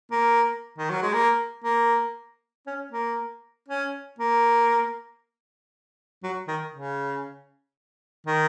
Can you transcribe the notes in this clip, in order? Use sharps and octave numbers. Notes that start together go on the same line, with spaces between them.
A#3
D#3
F#3
G#3
A#3
A#3
C#4
A#3
C#4
A#3
F#3
D#3
C#3
D#3